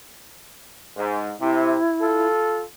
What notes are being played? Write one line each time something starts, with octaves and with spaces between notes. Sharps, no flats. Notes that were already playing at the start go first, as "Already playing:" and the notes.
G#2
C3 E4
F4 A4